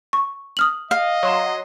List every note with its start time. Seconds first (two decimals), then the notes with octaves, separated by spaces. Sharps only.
0.13 C#6
0.57 D#6 F6 F#7
0.91 D#5 F5
1.23 F#3 C6 E7